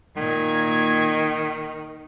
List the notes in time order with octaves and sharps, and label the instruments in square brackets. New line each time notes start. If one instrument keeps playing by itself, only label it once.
[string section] A#2 G#6 [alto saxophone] D#3